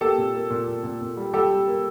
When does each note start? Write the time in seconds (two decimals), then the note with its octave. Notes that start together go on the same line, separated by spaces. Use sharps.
0.01 A#3 G4 A4
0.18 A#2
0.34 A#3
0.50 A#2
0.68 A#2
0.83 A#2
1.01 A#2
1.17 G3
1.34 G3 G4 A4
1.51 G3
1.67 A#3